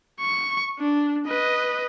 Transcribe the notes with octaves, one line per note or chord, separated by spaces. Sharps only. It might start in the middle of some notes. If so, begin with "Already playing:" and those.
C#6
D4
B4 D#5